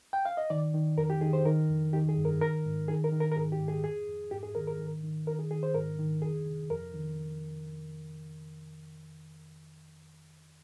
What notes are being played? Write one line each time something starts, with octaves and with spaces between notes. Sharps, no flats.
G5
F5
D#5
D#3 D5
D#3
F2 A#4
G4
D#3 G#4
C5
D#3 A#4
F2
D#3 G4
G#4
G2
A#4
D#3 A#4
G#2
D#3 G#4
A#4
D#3
A#4
A#4
G#2 G#4
G4
G#2
G#4
F2 G#4
F2
G#2 G4
G#4
D#3 A#4
A#4
D#3
D#3
D#3 A#4
G#4
D#3 G#4
C5
G#2 A#4
D#3
F2 G#4
C3
F2 A#4
D#3